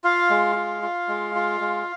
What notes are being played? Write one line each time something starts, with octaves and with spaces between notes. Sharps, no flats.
F4 F5
G#3
F4
F4
G#3
F4
G#3